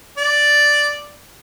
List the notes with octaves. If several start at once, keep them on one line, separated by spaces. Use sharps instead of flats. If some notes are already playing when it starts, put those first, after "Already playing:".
D5